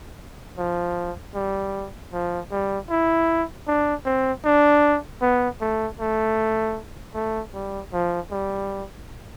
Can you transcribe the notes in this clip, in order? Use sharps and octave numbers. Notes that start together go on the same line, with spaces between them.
F3
G3
F3
G3
E4
D4
C4
D4
B3
A3
A3
A3
G3
F3
G3